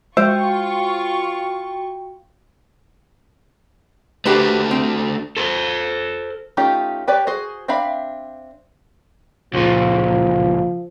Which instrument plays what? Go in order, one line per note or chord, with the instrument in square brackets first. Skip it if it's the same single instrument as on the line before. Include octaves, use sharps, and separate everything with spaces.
[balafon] G#3 [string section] F4 C#6 [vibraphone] F#4 G5 [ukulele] C5 F5
[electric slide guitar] A3 D4 F#4 [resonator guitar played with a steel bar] G4 B4 C5
[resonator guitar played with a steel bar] C4
[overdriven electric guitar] A4 C5
[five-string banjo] A3 C#4 D#4 F4 G4
G4 B4 C#5 D5
F#4 G#4 C5
C4 D4 E5 F5 B5
[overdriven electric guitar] C#2 A#2 [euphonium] F3